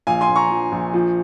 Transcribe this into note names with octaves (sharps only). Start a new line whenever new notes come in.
A#1 F5 G#5
G#5 C6
A#1
A#5 C#6
F3
A#1
F3